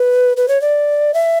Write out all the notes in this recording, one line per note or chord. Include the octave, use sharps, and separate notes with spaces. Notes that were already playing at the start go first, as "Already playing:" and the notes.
Already playing: B4
B4
C#5
D5
E5